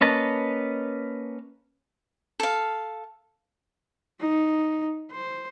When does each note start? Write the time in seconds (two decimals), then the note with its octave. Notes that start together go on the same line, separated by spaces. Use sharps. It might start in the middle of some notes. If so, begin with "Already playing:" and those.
0.01 A#3 C#4 B4 D#5 A5
2.40 A4 F5
4.20 D#4
5.12 C5